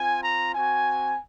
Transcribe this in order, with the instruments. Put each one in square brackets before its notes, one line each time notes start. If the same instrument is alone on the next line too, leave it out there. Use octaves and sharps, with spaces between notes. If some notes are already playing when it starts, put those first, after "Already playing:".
Already playing: [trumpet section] C4 F4 G#5
A#5
C4 F#4 G#5